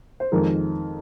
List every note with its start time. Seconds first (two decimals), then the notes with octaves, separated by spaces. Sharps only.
0.20 C5
0.32 F2 D#3 G#3 A#4